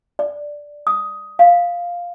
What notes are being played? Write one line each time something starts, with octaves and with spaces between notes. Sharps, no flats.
D5
D#6
F5